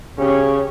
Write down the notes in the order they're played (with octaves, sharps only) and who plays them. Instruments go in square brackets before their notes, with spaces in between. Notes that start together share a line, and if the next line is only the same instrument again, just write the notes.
[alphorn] C#3 [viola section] C#4 G4 C#5